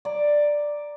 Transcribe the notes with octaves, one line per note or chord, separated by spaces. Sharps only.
D5 A#5